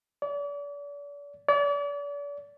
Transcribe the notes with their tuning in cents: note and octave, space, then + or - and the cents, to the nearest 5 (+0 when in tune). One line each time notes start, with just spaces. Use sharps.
D5 -40
D5 -40